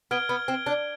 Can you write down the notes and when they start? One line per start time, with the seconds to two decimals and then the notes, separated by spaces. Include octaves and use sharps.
0.11 B3 F6 G#6 D7 G7
0.29 B3
0.48 C4
0.66 D4